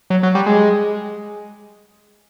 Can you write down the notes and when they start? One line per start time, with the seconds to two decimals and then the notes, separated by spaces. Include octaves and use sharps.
0.10 F#3
0.23 F#3
0.35 G3
0.46 G#3